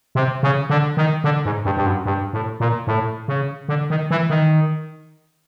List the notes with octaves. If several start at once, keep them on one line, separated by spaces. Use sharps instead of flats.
C3
C#3
D3
D#3
D3
G#2
G2
G2
F#2
G2
A2
A#2
A2
C#3
D3
D#3
E3
D#3